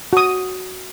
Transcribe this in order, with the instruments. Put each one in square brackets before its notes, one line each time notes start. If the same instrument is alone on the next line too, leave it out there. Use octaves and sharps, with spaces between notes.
[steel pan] F#4 D#6